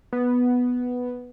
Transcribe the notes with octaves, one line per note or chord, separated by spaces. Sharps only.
B3